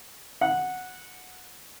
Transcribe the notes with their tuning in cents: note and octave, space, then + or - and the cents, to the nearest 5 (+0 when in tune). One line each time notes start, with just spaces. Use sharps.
F#5 -10